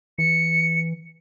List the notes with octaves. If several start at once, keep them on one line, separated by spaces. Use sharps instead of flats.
E3 C#7